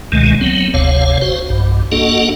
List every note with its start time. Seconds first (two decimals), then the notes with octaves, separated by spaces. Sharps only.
0.12 C#2 B2 D#3 G#3 A3
0.41 F#3 B3 C4
0.74 F#1 D2 C3 C#5 F5
1.21 F#4 C5
1.50 B1 G2
1.92 A#3 D4 F#4 A4 D#5 F#5